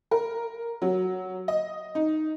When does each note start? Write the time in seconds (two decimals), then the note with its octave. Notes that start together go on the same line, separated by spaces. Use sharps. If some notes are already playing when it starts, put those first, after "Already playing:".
0.11 A#4
0.82 F#3
1.48 D#5
1.95 D#4